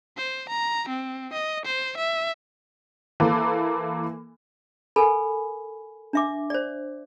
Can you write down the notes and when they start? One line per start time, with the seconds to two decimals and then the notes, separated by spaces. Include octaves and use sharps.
0.17 C5
0.49 A#5
0.89 C4
1.33 D#5
1.65 C5
1.97 E5
3.20 E3 A#3 A4
4.96 A4 A#4 G#5 B5
6.13 D4 E5 D6
6.50 C5 D5